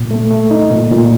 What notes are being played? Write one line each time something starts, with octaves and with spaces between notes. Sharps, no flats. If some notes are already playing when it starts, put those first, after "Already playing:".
Already playing: A#2
A3
A3
D#4
A#2
A#2